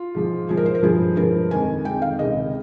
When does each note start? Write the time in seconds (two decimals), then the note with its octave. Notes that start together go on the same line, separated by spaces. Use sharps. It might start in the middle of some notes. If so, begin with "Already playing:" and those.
Already playing: F4
0.15 G#2 F3 G#3
0.49 G#2 F3 G#3 G#4
0.57 A#4
0.66 C5
0.75 A#4
0.83 G2 F3 G#3 G#4
1.17 G2 F3 G#3 A#4
1.51 F2 D#3 G#3 G#5
1.85 F2 D#3 G#3 G5
2.02 F5
2.19 C#2 C3 D#3 G#3 D#5